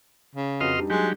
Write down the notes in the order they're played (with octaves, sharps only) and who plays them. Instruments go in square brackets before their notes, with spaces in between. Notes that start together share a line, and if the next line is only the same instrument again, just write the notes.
[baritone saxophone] C#3
[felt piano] F2 F#4 B4 [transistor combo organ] D#5 C6 F6
[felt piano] G3 D4 D#4
[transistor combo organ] F#3 G4 [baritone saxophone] G#3